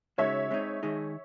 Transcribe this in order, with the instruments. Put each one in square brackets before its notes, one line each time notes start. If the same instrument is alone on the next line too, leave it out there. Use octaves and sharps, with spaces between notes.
[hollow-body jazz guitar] C#3 G#3 D#4 F#4 [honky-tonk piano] C#5 E5
[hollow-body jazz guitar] G#3 C4 D#4
D#3 G#3 D#4 G#4